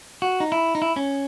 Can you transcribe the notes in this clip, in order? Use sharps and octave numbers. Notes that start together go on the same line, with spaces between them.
F#4
D#4
E4
D#4
E4
C#4